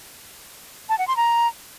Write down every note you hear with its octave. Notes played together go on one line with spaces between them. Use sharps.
A5
F#5
C6
A#5